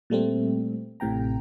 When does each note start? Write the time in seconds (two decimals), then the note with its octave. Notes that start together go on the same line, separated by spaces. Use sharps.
0.10 A#2 G3 A3 C4
1.00 A1 A2 C3 G5 A#5